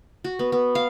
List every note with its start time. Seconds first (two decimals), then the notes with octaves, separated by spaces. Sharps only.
0.24 F#4
0.39 B3
0.52 B3
0.75 F5